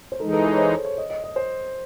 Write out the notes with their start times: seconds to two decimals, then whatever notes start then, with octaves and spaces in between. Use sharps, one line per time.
0.12 C5
0.20 E3 G#3 D#4 A4
0.28 G#4
0.33 A4
0.45 A4
0.53 C#5
0.58 C5
0.72 C#5
0.85 C#5
0.98 D#5
1.10 D#5
1.24 D#5
1.36 C5